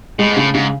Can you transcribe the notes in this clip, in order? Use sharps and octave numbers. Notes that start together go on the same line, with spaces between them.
A2 G#3
G#2
A2 C#3
G#2 C#3